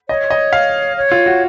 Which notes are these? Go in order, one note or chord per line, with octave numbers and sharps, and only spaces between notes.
C#5 D#5
D#5
F5
C#5
F4
F#4